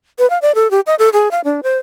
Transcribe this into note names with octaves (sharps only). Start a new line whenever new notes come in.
B4
F5
D5
A4
G4
D#5
A4
G#4
F5
D4
C5